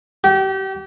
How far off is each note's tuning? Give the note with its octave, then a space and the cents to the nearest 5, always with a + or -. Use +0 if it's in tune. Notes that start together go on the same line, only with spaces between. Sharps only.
G4 -30